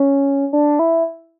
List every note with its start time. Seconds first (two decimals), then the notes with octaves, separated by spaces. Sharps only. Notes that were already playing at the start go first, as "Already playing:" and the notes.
Already playing: C#4
0.53 D4
0.79 E4